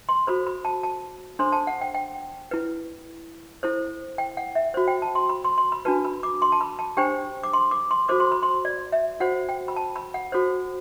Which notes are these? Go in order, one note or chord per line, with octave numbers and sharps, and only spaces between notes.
C6
F#4 A4 C5 B5
B5
A5
A5
D4 A4 C5 C6
A5
F#5
G5
G5
E4 B4
E4 A4 C5
G5
F#5
E5
F#4 C5
G5
A5
C6
B5
C6
C6
B5
D4 F#4 B4 A5
B5
D6
C6
A5
B5
A5
D4 G4 C5 G5
D6
C6
D6
C6
F#4 A4 C5 D6
C6
B5
C6
D5
E5
F#4 C5 F#5
G5
B5
A5
B5
F#5
F#4 A4 C5